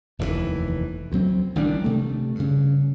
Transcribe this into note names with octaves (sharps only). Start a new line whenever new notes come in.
F1 D#2 C3 E3
D2 F#3 C4
A1 D#3 G3 D4
C3 A3
G2 C#3